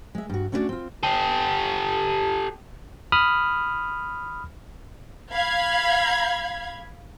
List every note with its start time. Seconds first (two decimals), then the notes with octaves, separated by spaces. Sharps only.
0.15 G#3 E5
0.30 G2 F#4
0.52 A3 C#4 D4 E4 F#4 D5
0.69 C4 F4
1.03 G4 A4
3.12 B5 D#6 F6
5.32 F5 B5 G#6